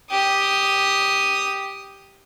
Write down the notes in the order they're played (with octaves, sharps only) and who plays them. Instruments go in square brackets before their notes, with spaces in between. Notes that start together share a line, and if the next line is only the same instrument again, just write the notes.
[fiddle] G4 D#6